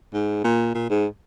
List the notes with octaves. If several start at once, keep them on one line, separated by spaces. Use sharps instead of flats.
G#2
A#2
A#2
G#2